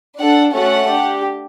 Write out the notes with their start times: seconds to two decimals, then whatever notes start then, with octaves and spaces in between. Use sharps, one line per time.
0.19 D4 A4 F#5
0.54 A3 C#4 F#4 A4 F#5
0.89 D4 G4